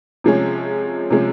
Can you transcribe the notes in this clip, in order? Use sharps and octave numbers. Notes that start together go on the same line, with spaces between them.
C3 F3 G#3 C#4
C3 F3 G#3 C#4